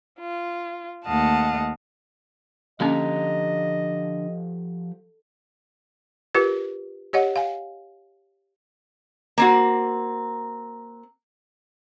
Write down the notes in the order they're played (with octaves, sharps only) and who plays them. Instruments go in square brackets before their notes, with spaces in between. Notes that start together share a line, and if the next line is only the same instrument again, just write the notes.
[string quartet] F4
D#2 A3 D#5 F5 F#5 A5
[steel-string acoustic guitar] D3 [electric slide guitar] F3 G4 A#5 [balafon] A#3 C#4 [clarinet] D#5
[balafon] F4 G4 A#4 B4
G4 C#5 D#5 F#5
F5 G#5
[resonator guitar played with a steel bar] A#3 C4 F#4